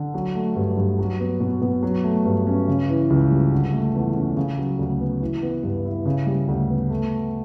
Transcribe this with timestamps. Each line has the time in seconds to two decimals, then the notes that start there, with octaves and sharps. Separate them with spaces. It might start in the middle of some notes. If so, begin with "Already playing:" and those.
Already playing: D3
0.14 F#3
0.35 A3
0.56 G2
0.77 G2
0.99 F#3
1.20 B3
1.40 B2
1.61 B2
1.83 F#3
2.04 A3
2.26 G2
2.47 C#4
2.67 C#3
2.89 E3
3.10 C#2
3.31 G3
3.52 D3
3.73 A3
3.95 E2
4.15 C#4
4.37 C#3
4.58 F#3
4.79 D2
5.01 B3
5.22 E3
5.43 B3
5.63 G2
5.85 E4
6.05 C#3
6.26 G3
6.48 D2
6.69 B3
6.90 A3